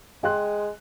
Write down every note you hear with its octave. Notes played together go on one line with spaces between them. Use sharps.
G#3 G5 C6 F#6